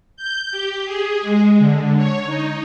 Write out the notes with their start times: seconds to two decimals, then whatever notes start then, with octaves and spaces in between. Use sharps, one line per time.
0.17 G6
0.51 G4
0.85 G#4
1.21 G#3
1.58 D3
1.97 C#5
2.26 D#4